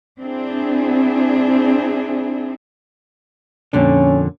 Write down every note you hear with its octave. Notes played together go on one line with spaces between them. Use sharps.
C4 D4 E4 G#4
F2 A#2 D3 C#4